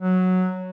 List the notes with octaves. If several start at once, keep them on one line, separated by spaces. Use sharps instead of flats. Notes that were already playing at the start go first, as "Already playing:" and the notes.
F#3